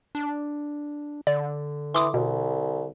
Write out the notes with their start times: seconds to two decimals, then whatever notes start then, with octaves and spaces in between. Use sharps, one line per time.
0.15 D4
1.27 D3 D5
1.95 E3 C6 D6 D#6
2.14 C2 B2